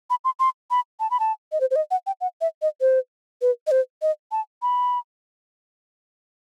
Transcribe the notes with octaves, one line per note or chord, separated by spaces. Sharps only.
B5
C6
C6
B5
A5
B5
A5
D#5
C5
C5
D#5
F#5
G5
F#5
E5
D#5
C5
B4
D#5
C5
D#5
A5
B5